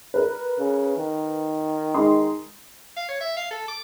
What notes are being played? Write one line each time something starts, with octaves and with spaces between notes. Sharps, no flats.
A#4 B4
C#3
D#3
G#3 D#4 C6
F5
C#5
E5
F5
A4
D6